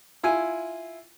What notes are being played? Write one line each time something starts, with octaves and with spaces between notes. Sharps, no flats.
E4 F4 G#5